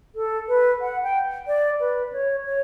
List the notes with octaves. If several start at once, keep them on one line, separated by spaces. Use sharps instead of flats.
A4
B4
F#5
G5
D5
B4
C#5
C#5